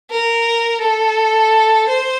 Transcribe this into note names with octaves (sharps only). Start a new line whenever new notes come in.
A#4
A4
C5